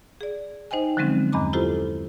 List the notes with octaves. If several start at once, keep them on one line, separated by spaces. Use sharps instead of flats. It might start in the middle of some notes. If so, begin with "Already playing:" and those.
G#4 D5
D#4 C5 D#5 G5 G#5
D3 F3 F#3 G#3 C4 C#4
E2 G2 D#5 A#5 D6
E4 F4 G4 A4 C5